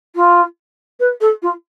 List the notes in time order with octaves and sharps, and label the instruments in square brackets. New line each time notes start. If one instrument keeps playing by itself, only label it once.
[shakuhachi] F4
B4
A4
F4